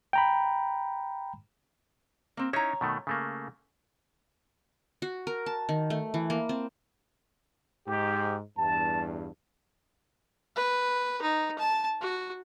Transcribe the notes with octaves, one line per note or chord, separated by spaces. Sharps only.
G5 A#5 B5
A#3 C4
C#4 D#4 E4 C#5 A#5
B2 D#3 A3
C#3 A3 A#3
F#4
A#4
A5
D#3
A3
E3
A#3
C4
G#2 G4
E2 G2 A5
B4
D#4
A5
F#4